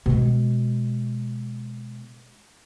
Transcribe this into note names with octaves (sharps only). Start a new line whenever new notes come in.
B2 G#3